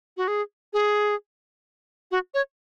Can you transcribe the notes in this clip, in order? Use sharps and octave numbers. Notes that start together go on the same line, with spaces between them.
F#4
G#4
G#4
F#4
C#5